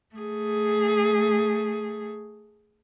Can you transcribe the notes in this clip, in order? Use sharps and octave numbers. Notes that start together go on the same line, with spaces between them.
A3 G#4